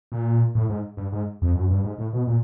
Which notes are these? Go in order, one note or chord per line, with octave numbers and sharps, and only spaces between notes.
A#2
A2
G#2
G2
G#2
F2
F#2
G2
G#2
A2
B2
A#2